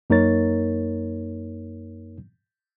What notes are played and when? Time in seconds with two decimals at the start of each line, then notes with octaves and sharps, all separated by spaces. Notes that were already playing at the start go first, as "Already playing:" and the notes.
0.10 F#2 A#3 D#4 A#4 C#5 A6